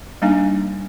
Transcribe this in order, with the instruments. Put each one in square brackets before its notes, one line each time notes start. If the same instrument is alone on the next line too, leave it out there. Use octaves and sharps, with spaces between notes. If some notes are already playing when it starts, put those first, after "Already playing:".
[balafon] G3 A#3 D4 D#4 F5 G#5